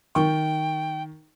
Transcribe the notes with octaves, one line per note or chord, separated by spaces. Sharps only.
D#3 G5 C#6